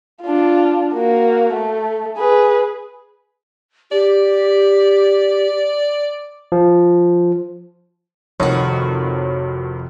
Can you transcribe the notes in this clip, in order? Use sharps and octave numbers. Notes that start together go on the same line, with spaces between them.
D4 F4
A#3 F#4
A3
G#4 B4
G4 D5
F3
F1 F2 D#3 D#4 F#4 C#5